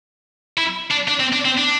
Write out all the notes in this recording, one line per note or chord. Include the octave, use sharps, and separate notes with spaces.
E4
D4
D4
C4
D4
C4
D4